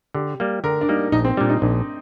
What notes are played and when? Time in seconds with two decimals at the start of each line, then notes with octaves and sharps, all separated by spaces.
0.14 D3 G4
0.40 G3 A#3
0.64 D3 A#4
0.81 D4
0.89 G3 A#3 D#4
1.12 A#1 D#4
1.25 C4
1.37 G3 D4
1.41 A#2
1.49 D#4
1.62 A#1 D4